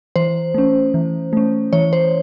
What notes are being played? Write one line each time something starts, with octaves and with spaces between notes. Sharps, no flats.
E3 C5
A3 C#4
E3
A3 C#4
E3 C#5
C5